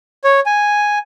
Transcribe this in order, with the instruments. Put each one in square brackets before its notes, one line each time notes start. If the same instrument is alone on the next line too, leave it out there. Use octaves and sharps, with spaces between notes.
[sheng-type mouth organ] C#5
G#5